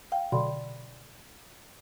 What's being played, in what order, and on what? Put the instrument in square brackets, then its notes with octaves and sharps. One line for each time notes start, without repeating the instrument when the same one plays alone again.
[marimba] F5 G5
[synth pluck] B2 D3 F#3 [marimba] D5 B5 C6